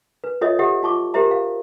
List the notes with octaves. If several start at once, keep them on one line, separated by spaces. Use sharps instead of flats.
B4
F4 A4 C#5 D#5 E5 D#6
G4 A4 E5 F#5
F4 A5 C#6 D6
G4 A#4 C5 E5 A#5
F5